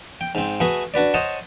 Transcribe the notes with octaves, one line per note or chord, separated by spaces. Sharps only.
G5
G#2 C4
A3 F#4 G#4 B4
D4 F#4 B4 D5
C5 C#5 D#5 F#5 A5